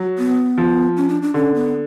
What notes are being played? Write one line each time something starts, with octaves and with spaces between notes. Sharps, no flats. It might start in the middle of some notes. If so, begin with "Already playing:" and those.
Already playing: F#3
B3
F3
C#4
D4
D4
D3 C#4
B3